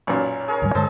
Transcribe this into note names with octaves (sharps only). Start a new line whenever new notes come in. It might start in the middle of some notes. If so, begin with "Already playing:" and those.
B1 F#2 A#2 C#4
G#4 A#4 C#5
D2 G#2 G3 C#4
G2 D3 G#3 G#4 C5 D#5 A5